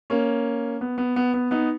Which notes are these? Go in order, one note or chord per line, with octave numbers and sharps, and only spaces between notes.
A#3 C#4
B3
B3
B3
B3
B3 D#4